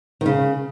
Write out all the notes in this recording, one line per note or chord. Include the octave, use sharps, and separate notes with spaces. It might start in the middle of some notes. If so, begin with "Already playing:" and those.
D#3
C#3